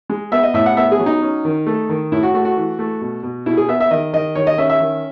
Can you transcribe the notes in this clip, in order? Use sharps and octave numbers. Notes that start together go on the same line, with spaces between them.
G#3
B3 E5
D#5
A2 E5
F#5
B3 E5
G#4
F#3
D#4
C#4
D#3
A3
D#3
A2 E4
F#4
A3 F#4
F#4
E3
A3
B2
B2
B2 E4
G#4
B3 E5
E5
D#3 D#5
D#3 D#5
D#3 C#5
D#5
C#4 E5
E5
D#3